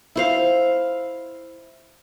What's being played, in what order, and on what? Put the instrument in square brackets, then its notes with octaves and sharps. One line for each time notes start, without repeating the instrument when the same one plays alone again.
[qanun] E4 C5 F5